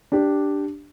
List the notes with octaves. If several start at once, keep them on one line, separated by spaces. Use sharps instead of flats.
D4 G4